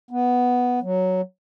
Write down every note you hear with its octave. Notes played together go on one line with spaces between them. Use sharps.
B3
F#3